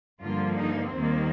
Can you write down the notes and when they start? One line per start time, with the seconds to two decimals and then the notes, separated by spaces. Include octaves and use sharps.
0.21 G2 D3 F3 A#3 F4
0.57 D#4
0.93 D#2 D#3 G3 A#3 C4